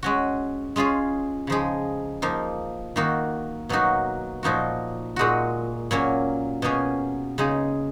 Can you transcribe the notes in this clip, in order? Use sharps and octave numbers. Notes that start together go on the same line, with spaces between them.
G#3 C#4 F#4
G#3 C#4 F4 G#4
C#3 F3 G#3 D#4 G#4
F3 A#3 D#4
D#3 A#3 D#4 F#4
B2 F#3 A#3 D#4 F#4
A#2 F3 A#3 D#4 F#4
A#2 G#3 D#4 F#4
A#2 F#3 A#3 C#4
B2 A#3 C#4 G#4
C#3 G#3 D#4 G#4